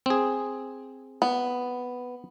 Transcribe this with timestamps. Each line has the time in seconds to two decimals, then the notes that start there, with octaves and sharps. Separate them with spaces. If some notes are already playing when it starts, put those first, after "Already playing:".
0.06 C4 G#4
1.22 B3